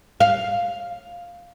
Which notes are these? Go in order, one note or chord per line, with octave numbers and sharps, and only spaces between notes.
F5